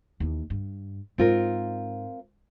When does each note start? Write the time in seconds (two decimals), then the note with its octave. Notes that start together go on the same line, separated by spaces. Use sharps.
0.20 D#2 E3
0.50 G2
1.18 G#2 C4 F4 A#4